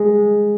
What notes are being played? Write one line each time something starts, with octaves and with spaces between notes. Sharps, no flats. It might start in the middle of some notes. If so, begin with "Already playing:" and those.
Already playing: G#3